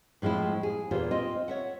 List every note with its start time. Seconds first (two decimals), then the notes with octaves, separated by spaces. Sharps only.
0.22 A2 F3 G#3 C4 E4
0.63 G#4
0.91 E2 A#2 F4 G4 C5
1.11 C4 F4 D#5
1.48 C#5 E5 F#5